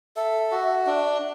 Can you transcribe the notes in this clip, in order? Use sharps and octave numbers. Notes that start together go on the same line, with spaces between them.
A4 E5
F#4
D4